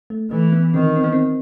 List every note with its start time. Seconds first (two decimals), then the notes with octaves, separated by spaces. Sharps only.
0.10 A3
0.31 E3 A3
0.52 B3
0.74 D#3 C4
0.96 C4
1.04 B3
1.13 C4